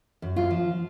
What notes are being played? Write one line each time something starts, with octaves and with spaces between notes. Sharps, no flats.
F#2
F4
F3